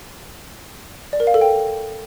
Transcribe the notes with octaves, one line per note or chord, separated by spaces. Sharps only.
D5
A#4
F5
A4
G5